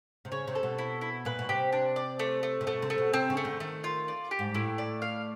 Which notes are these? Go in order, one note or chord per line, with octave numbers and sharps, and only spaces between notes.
C3
C#3 C#5
C3
A4
B2
E4
E4
A#2 B4
B2
C3 G4
D4
D5
A3
A3
C3
B2 A3
C3
A3
B2
C3 C4
C#3
A3
D3
D#3 A3
F4
D5
G4
G#2
A2 E4
D5
F5